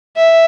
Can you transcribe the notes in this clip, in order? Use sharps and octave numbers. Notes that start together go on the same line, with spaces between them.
E5